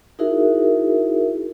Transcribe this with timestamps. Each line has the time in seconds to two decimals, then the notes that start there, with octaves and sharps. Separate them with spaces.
0.19 D#4 E4 F#4 G#4 A#4 E5